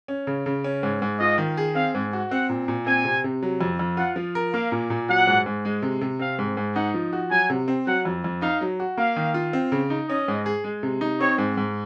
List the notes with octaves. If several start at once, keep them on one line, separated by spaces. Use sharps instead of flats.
C#4
C#3
C#3
C#4
G#2
G#2
F4 D#5
D#3
G#4
C4 F5
G#2
F#4
C4 F#5
A#2
A#2
C4 G#5
C3
C3
F#3
F2
F2
F4 F#5
F3
A#4
A#3 F5
A#2
A#2
F#3 F#5
G#2
G#2
G#3
C3
C3
C4 F5
G#2
G#2
D#4 F#5
F3
F#4
F#3 G#5
C3
C4
F#3 F#5
F2
F2
D#4 F5
F#3
F#4
A#3 F5
D#3
F4
C4
C#3
D#4
C#4 D#5
G#2
G#4
G#3
C3
D#4
C4 C#5
G#2
G#2